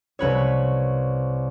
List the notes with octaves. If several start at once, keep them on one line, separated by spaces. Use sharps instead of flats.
C2 B4 C#5